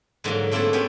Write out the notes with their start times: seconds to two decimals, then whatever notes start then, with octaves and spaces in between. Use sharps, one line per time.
0.24 G#2 D3 F#3 A#3
0.51 A3 A#3 C4 D4 E4 A4
0.73 B3 C#4 G4